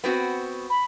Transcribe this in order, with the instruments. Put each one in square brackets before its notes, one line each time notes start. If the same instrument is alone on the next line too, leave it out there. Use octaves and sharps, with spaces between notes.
[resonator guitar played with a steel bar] B3 C4 F#4
[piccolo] B5